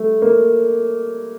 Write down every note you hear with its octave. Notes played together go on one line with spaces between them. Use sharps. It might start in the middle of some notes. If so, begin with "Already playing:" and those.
Already playing: G3 A3
A#3